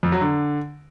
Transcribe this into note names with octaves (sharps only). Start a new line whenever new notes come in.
F2
F#3
D3